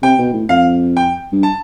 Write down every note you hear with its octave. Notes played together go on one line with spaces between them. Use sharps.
C3 G5
B2
A2
F2 F5
G5
G2
A5